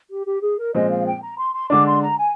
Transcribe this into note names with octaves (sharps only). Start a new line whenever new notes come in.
G4
G4
G#4
A#4
A#2 F3 G#3 C4 D#5
F5
G5
A#5
C6
C6
D3 G#3 D4 D6
C6
A#5
G#5